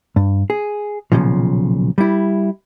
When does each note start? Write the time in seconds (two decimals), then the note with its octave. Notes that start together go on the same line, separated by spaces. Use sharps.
0.16 G2
0.50 G#4
1.12 B1 E2 A#2 C#3 F3
1.98 G3 E4